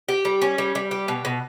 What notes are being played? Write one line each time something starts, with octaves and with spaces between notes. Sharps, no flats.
G4
G3
C#4
G3
G3
G4
B2
B2